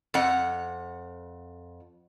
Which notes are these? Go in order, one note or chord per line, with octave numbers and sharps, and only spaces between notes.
F2 F#5